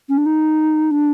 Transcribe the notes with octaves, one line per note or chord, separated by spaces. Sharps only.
C#4
D4
D#4
D4